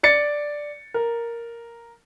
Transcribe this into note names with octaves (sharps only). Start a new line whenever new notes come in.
D5 A6 C#7
A#4